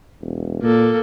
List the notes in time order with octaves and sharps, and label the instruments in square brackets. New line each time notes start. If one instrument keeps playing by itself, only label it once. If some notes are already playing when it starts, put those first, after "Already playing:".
[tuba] E1
[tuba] A#2 [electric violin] A#3 A4